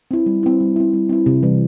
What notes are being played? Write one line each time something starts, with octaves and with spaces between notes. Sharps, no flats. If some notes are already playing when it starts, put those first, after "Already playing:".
C4 E4
G3
C4 E4
G3
C4 E4
G3
C4 E4
C3
E3 G3